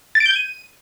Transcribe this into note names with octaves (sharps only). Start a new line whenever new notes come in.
A6
D7
G6
G#6
D#7